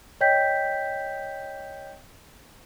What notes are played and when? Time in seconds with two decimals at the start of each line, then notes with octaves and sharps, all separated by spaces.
0.21 C#5 D#5 G5 G6 B6